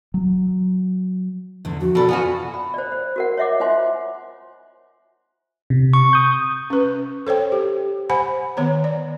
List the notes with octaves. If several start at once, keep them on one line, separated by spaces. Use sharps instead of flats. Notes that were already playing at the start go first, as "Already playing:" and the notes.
F#3
E2 D3
F2 F#4
B2 A4 D5 B5
B3 F4 F#4 G#5
B5
C5 D5
C5
F#4 A#4 F#5
C#5 D#5 E5 F#5 D6
F4 C5 G#5 C6
C3
C#6
D#6 G6
C#4 B4
A4 C5 C#5 G5
G4
C5 F#5 G#5 B5
D#3 B3 C#5 A#5
D5